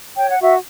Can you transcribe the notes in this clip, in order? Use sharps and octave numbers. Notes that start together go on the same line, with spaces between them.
C#5 G5
F#5
F#4 E5